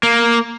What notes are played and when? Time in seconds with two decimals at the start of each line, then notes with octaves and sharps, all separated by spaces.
0.03 A#3